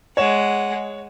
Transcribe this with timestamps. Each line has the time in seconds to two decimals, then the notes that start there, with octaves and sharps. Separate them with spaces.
0.17 G#3 C#5 F#5 E7